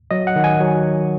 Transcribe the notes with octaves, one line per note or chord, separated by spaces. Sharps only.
F#3 D#5
F#5
D#3
G#5
F#3